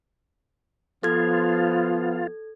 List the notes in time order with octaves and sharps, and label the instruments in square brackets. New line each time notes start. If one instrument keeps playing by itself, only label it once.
[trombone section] F3 B3 [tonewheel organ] F4 [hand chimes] A4 G#6